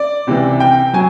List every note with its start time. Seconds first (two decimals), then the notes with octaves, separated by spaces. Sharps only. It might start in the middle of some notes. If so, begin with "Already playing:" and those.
Already playing: D5
0.27 C#2 C3 E3
0.60 G5
0.93 F#3 G#5